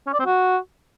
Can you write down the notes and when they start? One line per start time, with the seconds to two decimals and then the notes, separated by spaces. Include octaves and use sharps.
0.07 C#4
0.13 D5
0.20 C4
0.26 F#4